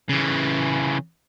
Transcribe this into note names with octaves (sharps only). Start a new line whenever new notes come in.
C#3 E3